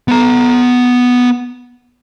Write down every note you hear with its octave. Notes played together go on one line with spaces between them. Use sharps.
B3 A#5